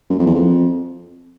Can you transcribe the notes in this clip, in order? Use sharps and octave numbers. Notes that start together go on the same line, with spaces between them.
F#2
F2
E2
F2